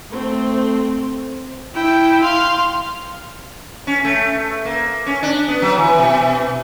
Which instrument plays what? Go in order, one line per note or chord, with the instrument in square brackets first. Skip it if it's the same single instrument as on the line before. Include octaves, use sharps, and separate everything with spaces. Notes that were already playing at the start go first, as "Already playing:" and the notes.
[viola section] A3 C4
[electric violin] E4 G5
F5 C6
[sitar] C#4
A3
A#3
C#4
D4
B3
F#3
E3
B2